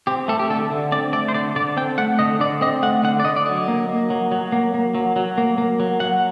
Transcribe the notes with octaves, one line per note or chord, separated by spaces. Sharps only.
C4 G4
A3 A4
G4
D3 A4
D3
C4 D5
A3 D5
C5
D3 D5
D3 D5
C4 G5
A3 F#5
D3 D#5
D3 D5
C4 D#5
A3 F#5
D3 F#5
D5
D3 D#5
D5
F#3 D#5
A#3
A#3
F#3
F#3
A#3
A#3
F#3
F#3
A#3
A#3
F#3
F#3 F#5